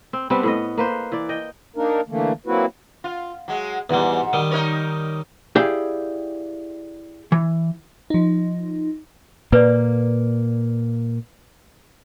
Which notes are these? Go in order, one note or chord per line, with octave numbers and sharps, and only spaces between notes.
C4
G3 B3 C4 D4
A2 B3 D#5
A#3 B4 C5
E3 D5
D#5 G5
A#3 D4 D#4 A#4
D3 E3 A3 A#3
F#3 A#3 C4 E4 F#4 B4
F4
F#3 G#3
E2 G#2 G3 F#4
D#3 G3
D#4 A#4 C#5
E4 G4 G#4 D5 F5 G5
E3
F3 D#4
A#2 A#3 B4 D5